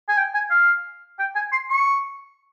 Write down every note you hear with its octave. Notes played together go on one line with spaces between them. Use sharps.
G#5
G5
G#5
F5
G5
G#5
C6
C#6